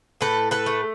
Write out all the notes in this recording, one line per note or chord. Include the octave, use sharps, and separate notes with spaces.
A2 A4 B4
A4 B4
A3